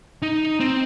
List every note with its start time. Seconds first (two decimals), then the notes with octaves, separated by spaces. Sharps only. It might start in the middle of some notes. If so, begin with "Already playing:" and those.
0.22 D#4
0.60 C4